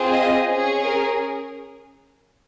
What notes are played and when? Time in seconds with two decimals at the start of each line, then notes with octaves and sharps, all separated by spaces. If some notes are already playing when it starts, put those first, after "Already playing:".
Already playing: C4 F4 G#4
0.12 D#5
0.48 C#4 G#4
0.84 A#4